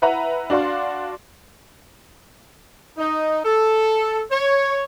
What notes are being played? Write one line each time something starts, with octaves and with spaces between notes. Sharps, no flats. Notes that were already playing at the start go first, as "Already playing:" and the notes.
E4 B4 E5 F#5 A#5
D4 F#4 D5 F5 C6
D#4
A4
C#5